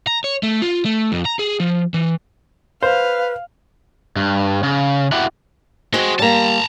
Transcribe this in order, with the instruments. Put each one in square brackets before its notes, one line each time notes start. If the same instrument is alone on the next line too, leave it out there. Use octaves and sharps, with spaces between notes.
[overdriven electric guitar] A#5
C#5
A3
F4
A3
F2
A#5
G#4
F3
E3
[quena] B4 [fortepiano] C5 [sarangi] F5
[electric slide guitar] G2
C#3
E4 F#4 G4 E5 F#5
[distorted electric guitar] G#3 [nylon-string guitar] C4 F#4
[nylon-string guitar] G3 A#3 [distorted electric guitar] A5 A#5